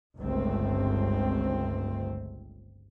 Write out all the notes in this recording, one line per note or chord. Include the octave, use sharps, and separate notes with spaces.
G1 C#2 A3 C4